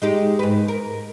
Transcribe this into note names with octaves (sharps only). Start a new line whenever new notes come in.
G#3 D#4 G4
G#2 B4
A#4